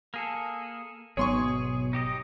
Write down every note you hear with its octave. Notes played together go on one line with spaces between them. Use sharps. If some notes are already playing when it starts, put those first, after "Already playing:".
A#3 G#4 A4
G#1 B2 F#3 B3 G#4 C#5 C6 C#6
D#4 G4 D#5